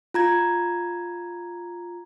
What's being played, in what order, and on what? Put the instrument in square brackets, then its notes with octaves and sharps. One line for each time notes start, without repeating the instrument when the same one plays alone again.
[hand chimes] F4 A#5 G#6